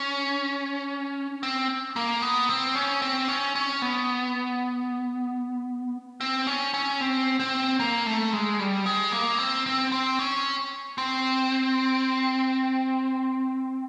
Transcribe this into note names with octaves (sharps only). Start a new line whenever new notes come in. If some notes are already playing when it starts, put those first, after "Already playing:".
Already playing: C#4
C4
A#3
B3
C4
C#4
C4
C#4
C#4
B3
C4
C#4
C#4
C4
C4
A#3
A3
G#3
G3
G#3
A#3
C4
C4
C4
C#4
C4